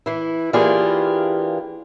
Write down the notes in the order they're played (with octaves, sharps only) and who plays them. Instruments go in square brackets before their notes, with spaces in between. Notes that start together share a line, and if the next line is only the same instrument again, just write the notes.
[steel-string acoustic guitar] E3 E4
E3 A#3 D4 F4 G4 G#4